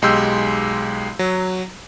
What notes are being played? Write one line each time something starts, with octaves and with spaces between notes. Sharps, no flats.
B1 G#3 G4 C6 E6 G6
F#3